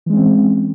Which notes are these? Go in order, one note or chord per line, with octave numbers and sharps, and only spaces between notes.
E3 G#3 C4 C#4